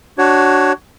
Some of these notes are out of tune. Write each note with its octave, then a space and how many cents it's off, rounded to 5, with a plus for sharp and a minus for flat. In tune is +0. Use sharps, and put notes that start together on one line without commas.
D4 +0 F#4 +15 C#5 -5